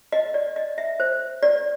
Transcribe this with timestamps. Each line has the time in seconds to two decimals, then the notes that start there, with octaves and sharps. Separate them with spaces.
0.12 D#5
0.34 D5
0.56 D#5
0.78 E5
1.00 C5
1.43 D5